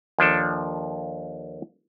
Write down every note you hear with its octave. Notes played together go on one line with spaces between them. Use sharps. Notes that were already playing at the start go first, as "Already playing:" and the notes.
D#2 F3 D4 A4